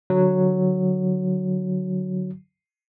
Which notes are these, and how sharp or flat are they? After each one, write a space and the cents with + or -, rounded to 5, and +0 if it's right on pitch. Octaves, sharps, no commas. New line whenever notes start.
D3 +0 F#3 +0